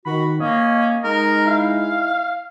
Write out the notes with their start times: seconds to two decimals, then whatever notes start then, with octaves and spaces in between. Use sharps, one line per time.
0.05 D#3 F#4 B5
0.40 A#3 C#4 D#5
1.04 G#3 D#4 A#4
1.47 E4 F5